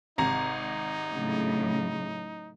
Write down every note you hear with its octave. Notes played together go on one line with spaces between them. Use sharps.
G#1 C3 D#4 A#5
A2 C#3 F#3